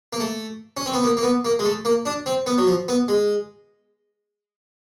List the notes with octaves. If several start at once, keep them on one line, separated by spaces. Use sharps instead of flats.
A#3
A3
C#4
C4
B3
A#3
A#3
B3
A#3
G#3
A3
A#3
D4
C4
B3
F#3
F3
B3
G#3